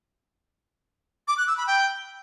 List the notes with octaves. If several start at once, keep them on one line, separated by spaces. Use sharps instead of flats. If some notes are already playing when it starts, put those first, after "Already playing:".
D6
F#6
E6
B5
G5